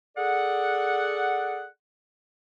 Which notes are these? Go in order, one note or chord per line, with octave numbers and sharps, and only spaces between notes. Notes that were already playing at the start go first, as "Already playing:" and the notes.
G#4 A4 D5 F#5